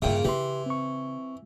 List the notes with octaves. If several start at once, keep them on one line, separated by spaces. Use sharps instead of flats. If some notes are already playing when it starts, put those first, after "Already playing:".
G2 A#2 C#3 E4 E5 G5
C#3 E3 G4 C6
C4 C#6